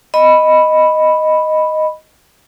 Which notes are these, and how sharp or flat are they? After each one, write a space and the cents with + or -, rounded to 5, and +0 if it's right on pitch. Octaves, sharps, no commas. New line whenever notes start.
D#5 +0 B5 +0